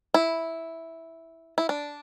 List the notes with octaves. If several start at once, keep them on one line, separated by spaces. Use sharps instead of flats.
E4
E4
D4